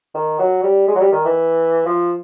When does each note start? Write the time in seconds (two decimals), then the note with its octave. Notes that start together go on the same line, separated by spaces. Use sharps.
0.14 D#3
0.39 F#3
0.63 G3
0.88 G#3
0.95 F#3
1.00 G3
1.12 D#3
1.25 E3
1.86 F3